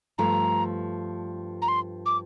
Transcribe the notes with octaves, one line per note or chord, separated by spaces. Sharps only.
G2 F3 A3 A#5
A#5
C6
D6